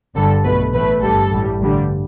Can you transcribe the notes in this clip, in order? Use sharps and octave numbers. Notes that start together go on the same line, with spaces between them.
G1 G2 D3 G3 A4
B1 B2 A3 B4
A1 A2 A3 B4
G1 G2 G3 A4
A1 A2 G3
A1 G2 D3 G3